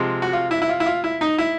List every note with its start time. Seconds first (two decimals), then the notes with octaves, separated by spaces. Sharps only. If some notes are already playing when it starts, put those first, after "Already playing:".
Already playing: C3 F3 G#3
0.22 F#4
0.33 F4
0.51 E4
0.62 E4
0.69 F4
0.80 E4
0.86 F4
1.04 E4
1.21 D#4
1.38 E4